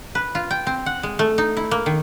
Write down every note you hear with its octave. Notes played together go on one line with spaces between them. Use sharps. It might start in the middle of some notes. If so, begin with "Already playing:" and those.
B4
F4
G5
C4
F#5
G#3
A3
D#4
E4
A#3
D#3